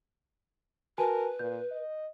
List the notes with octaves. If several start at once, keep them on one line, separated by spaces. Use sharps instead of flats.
F#4 A#4 B4 G#5 A5
A#2 G6
D#5